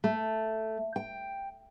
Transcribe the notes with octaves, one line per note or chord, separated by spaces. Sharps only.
A3
G5